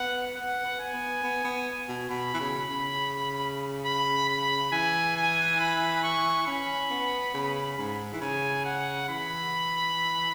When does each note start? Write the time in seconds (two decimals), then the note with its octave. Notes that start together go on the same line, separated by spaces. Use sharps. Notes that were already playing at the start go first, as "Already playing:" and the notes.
Already playing: B3 F#5
0.36 B3 F#5
0.65 B3
0.80 G#5
0.94 B3
1.24 B3
1.44 B3
1.89 B2
2.10 B2 B5
2.34 E3
2.40 C#3
2.68 C#3
3.85 B5
4.29 B5
4.72 E3 G#5
5.16 G#5
5.60 B5
6.04 C#6
6.47 C#4 B5
6.91 B3
7.34 C#3
7.78 G#2
8.13 E3
8.21 C#3 G#5
8.65 F#5
9.09 E3 B5